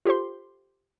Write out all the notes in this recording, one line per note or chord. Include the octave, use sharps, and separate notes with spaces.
F4 G4 A4 C5 C6